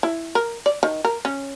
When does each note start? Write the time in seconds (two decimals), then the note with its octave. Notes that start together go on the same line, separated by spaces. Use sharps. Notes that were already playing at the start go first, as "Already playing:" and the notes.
0.03 E4
0.35 A#4
0.66 D5
0.83 D#3
1.04 A#4
1.25 C#4